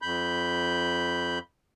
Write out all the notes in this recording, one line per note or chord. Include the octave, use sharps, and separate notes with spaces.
F2 B5 G6